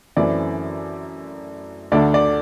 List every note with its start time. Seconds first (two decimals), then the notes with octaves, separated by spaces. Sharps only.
0.16 F#2 E3 A3 C4 E4 D5
1.92 D2 D3 A3 D4 D5
2.14 D5